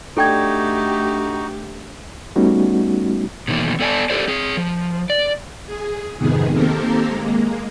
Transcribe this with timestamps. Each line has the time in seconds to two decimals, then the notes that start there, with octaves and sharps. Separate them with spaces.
0.17 A3 D4 D#4 F#4 G4 A4 G5 G#6
2.36 G3 A3 B3 C#4 D#4 F#4
3.48 B2 D#3 E3 F#3 A3 A#3
3.79 B3 A4 D5 G#5 A5
4.10 G4 A4 A#4 C5 D5
4.28 C4 G#4
4.57 F3
5.10 D5
5.67 G#4
6.17 F2 G#2 C3 D#3 B3 G#4
6.53 D#3 A#3 C4 G4 A4 A#4
7.09 G#3 A#3